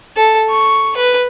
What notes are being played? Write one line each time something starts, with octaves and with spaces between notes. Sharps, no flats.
A4
C#6
B4